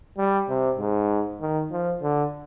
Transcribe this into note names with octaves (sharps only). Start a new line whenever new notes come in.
G3
C3
G#2
D#3
F3
D3